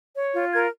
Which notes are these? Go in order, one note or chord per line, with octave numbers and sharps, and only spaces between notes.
C#5
F4
A#4 G#6